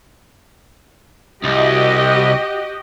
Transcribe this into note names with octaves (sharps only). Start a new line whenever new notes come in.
C2 F#4 G4 D#5